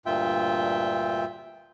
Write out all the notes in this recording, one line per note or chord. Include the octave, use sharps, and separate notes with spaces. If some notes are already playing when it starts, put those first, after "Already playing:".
D2 G2 A#2 F4 E5 G5